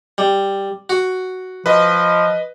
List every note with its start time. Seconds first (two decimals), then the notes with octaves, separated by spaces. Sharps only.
0.18 G3
0.90 F#4
1.66 F3 B4 D#5